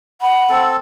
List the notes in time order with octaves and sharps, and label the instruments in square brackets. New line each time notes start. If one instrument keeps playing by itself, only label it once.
[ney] F#5 [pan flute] B5
[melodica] C4 A4